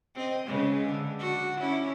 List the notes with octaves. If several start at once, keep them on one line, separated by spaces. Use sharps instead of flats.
C4 D#5
C#3 G#3 B4
D3
D4 F#4
C#4 D4 E4